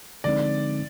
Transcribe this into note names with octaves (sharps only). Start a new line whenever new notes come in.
D3 F3 G#3 C4 D#4 D5